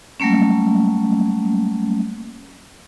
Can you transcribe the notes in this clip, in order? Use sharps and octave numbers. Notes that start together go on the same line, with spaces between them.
F#3 G3 A3 A#3 C#4